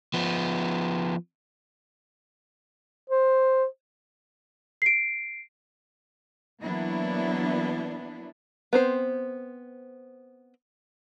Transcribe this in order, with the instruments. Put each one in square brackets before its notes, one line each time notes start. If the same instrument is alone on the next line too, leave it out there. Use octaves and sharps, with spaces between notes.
[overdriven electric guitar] F3 B3
[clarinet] C5
[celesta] C7 D7
[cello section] E3 F#3 A#3 B3 D4 E4
[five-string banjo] B3 C4 C5